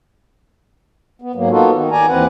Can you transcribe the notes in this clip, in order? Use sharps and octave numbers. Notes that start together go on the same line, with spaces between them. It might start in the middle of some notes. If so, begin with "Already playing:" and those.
B3
G#2 F#3 A#3
A#3 B3 D#4 F4 F#4 A4
D#3
D#3 D5 G#5 A#5
D#2 E3 C4 B4 F#5